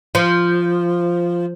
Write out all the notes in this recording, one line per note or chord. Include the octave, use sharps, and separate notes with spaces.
F3